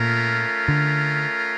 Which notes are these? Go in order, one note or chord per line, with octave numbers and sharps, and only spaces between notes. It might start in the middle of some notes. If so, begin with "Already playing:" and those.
Already playing: A#2 A3 C#4 F4 A#4
D3